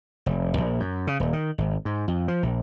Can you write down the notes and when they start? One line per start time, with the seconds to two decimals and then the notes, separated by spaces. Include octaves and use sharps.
0.26 F1
0.57 A#1
0.80 F#2
1.07 C#3
1.20 D#1
1.33 D#3
1.58 G#1
1.85 G#2
2.08 F2
2.28 F3
2.43 A#1